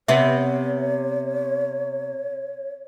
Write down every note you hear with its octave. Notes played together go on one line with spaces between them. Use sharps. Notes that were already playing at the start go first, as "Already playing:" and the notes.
C3 B3 C#5 E5